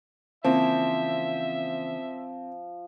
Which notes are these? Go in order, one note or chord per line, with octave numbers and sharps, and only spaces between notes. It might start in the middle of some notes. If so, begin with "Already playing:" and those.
C#3 E3 F3 A#3 C4 E5